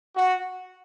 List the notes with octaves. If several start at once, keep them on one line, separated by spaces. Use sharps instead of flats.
F#4